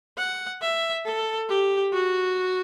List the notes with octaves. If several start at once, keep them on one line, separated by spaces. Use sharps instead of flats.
F#5
E5
A4
G4
F#4